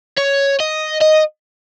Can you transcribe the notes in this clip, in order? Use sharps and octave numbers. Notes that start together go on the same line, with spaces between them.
C#5
D#5
D#5